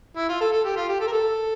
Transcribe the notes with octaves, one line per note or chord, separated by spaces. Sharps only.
E4
F4
A4
A4
G4
F4
G4
A4
A#4
A4